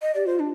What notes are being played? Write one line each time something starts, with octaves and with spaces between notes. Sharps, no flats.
D#5
G4 D5
F4 C5
D4